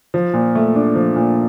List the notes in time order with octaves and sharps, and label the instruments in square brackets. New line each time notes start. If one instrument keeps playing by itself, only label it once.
[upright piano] F3
A#2
A3
D4
F3
A#2